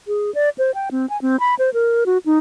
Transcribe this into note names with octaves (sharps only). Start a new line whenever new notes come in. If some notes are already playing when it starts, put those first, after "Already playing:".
G#4
D5
C5
G5
C4
G#5
C4
B5
C5
A#4
F#4
D#4